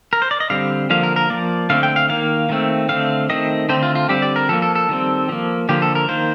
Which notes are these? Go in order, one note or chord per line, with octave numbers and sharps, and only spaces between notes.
A#4
C5
D5
D#5
D3 G3 C4 F5
D3 F3 A#3 F5
A#4
A#4
F3 A#3 D5
D3 A3 C4 F5
G5
F5
D#3 A#3 F5
D#3 A3 C4
D3 A3 C4 F5
D#3 A3 C4 D#5
D3 A3 C4 C5
F4
F4
D3 G3 C4 G4
D5
A#4
F3 A#3 A4
A4
A4
D#3 G3 C4
F3 A#3
D3 F3 A#3 G4
A4
A#4
D#3 A#3 C5